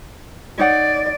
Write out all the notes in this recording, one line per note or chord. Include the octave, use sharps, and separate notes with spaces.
D#4 C#5 D5 F#5